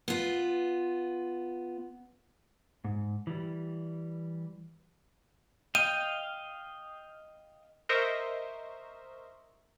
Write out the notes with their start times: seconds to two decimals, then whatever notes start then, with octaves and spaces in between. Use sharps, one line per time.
0.08 B3 F4
2.84 G#2
3.27 E3 G3
5.75 D#5 F5 G5 D#7
7.89 A#4 C5 D#5 E5 C#6